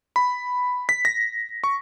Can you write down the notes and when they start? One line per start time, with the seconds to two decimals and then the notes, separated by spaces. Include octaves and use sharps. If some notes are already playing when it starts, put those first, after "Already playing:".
0.16 B5
0.89 B6
1.05 A#6
1.64 C#6